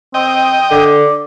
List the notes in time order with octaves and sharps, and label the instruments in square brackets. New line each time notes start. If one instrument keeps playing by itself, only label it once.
[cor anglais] C4 [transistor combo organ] D#5 G5
[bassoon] D3 [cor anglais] D5